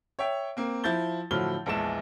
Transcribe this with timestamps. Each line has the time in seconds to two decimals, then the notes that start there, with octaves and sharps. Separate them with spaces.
0.19 C#5 E5 G5
0.57 A#3 C4
0.84 F3 E4 G6 A6 G7
1.31 A2 D3 F3 F#3 F6 G7
1.66 A#1 E2 G#3 E5 A5 E7